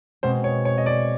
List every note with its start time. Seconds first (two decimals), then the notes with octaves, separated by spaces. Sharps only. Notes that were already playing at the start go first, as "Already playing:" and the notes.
0.23 B2 G#3 C4 C5
0.44 C#5
0.65 C#5
0.78 D#5
0.86 D5